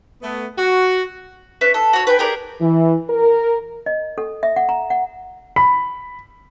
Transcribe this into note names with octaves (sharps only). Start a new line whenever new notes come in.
A3 B3
F#4
C#4 B4 E5
A4
F#4 C#5
B4 G5 G#5
G4 G#4 A#4 D5
E3
A#4
D#5
A4
E5
F#5
A#5
F#5
B5